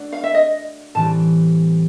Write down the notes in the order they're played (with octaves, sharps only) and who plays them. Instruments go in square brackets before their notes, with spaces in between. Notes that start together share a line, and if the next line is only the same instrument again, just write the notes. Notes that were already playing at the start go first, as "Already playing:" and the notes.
Already playing: [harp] A3 D4 F#4
[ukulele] F5
E5
D#5
[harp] A2 E3 G3 C4 [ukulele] A5